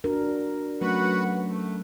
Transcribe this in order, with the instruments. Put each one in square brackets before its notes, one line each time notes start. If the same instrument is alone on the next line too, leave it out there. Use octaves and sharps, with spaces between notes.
[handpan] D4 F#4 A#4
[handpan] F#3 A3 C#4 [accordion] F#4 B4 F#5
[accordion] A3